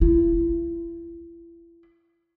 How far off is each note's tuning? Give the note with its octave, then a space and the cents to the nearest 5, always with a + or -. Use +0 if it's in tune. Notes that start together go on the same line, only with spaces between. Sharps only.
E4 +35